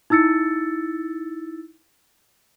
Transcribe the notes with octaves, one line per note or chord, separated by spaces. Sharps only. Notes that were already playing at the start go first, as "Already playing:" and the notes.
D#4 E4 E6 A6 C#7